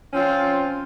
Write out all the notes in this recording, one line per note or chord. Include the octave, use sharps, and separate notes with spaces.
F3 C4 C#4 F4